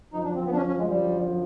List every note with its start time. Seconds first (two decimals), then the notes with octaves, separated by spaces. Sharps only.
0.14 F#2 D3 F3 D#4
0.24 D4
0.35 C4
0.45 B3
0.52 D4
0.56 C#4
0.67 C#4
0.78 G#3
0.89 G3